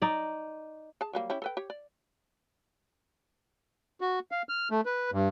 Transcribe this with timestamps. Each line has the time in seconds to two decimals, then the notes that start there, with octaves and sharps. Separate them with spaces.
0.02 D#4 D5
1.01 G#4 A5
1.13 F#3 G3 A#3
1.30 C#4 E4 G4
1.42 A4 B4 G5
1.57 G4 C#5
1.70 D5
4.01 F#4
4.32 F5
4.49 F6
4.71 A3
4.86 B4
5.12 G2